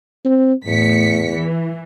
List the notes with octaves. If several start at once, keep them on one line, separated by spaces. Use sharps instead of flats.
C4
E2 A2 B6 C#7
E3